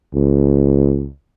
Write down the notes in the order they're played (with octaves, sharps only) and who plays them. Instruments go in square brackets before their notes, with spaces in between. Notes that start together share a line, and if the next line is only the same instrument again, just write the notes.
[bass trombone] C#2